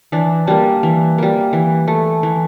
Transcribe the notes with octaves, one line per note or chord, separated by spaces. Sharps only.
E3 D4
G3 A#3 D4
E3
G3 A#3
E3
A3
E3